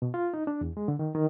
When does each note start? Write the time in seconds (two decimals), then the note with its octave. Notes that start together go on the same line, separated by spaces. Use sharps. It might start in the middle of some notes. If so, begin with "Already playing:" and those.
0.02 B2
0.14 F4
0.34 D#4
0.47 D4
0.61 E2
0.77 G#3
0.88 D3
0.99 D#3
1.15 D#3